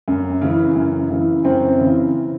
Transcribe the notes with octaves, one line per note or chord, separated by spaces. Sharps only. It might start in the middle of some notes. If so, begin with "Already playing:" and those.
F#2
C#3 E3
F#2
C#3 E3
F#2 C4
C#3 E3